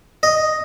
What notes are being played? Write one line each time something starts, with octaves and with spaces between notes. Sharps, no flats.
D#5